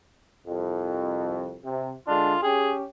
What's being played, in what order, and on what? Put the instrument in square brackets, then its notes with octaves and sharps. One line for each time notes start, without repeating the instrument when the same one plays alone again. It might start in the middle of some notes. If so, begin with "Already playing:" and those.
[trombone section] C2 F2
C3
[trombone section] D3 G#3 D4 [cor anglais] F4
[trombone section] C#4 G4 [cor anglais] G#4